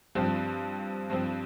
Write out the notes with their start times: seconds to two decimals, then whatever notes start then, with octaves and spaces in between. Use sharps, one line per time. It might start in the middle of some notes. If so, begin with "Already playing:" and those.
0.15 G2 F3 C4
1.10 G2 F3 C4